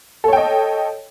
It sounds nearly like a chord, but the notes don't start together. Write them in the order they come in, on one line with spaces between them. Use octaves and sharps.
A4 C#5 G5 D#5